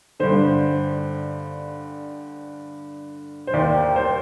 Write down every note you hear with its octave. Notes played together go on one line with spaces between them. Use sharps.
G2 D3 C5
C5
D#2 D#3 D5
C5